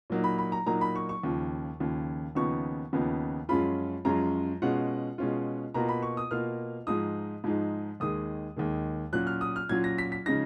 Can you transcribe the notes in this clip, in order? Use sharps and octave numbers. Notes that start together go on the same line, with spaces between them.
A#2 F#3 A#3 D#4
B5
B5
A#5
A#2 F#3 A#3 D#4 A#5
B5
C#6
C#6
D#2 C#3 F3
D#2 C#3 F3
D#2 C#3 F3 B3 D#4 C#6
D#2 C#3 F3 B3 D#4
F#2 F3 G#3 C#4 F4 B5
F#2 F3 G#3 C#4 F4 A#5
B2 G#3 C#4 F4 F#5
B2 G#3 C#4 F4
B2 A#3 F4 A#5
B5
C#6
D#6
B2 A#3 F4 F6
G#2 F3 G#3 D#4 D#6
G#2 F3 G#3 D#4
D#2 D#3 G#3 D#6
D#2 D#3 G#3
A#2 F#3 C#4 F4 F#6
F6
D#6
F6
A#2 F#3 C#4 F4 G#6
A#6
B6
B6
C#3 F3 G#3 D#4 A#6